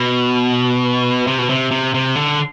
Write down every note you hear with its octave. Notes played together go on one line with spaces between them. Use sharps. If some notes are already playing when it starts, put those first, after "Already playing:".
Already playing: B2
C3
B2
C3
C3
C3
D3